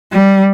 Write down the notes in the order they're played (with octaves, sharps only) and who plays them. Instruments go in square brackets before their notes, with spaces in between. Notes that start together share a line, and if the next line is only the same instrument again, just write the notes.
[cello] G3